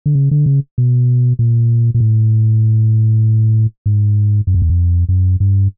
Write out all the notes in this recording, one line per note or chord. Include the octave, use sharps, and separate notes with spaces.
D3
C#3
D3
C#3
B2
A#2
A#2
A2
G#2
F#2
F2
E2
F2
F#2
G2